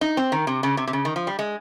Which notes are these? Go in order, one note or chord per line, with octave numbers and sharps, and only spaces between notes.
D#4
C4
D#3
C3
C#3
C3
C3
C#3
D#3
F3
G3
G#3